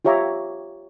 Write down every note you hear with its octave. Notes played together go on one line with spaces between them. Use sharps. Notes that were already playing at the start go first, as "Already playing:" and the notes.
F4 G4 C#5 E5 A#5 D6